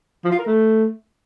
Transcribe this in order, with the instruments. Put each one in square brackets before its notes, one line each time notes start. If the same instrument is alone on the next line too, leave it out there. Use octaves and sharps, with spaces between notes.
[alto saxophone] F3
F4
A#4
A3